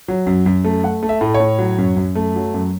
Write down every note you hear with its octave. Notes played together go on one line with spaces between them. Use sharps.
F#3
F#2
F#2
A3
A3 F#5
A3
E5
A2
C#5
A2
F#3
F#2
F#2
A3
F#3
F#2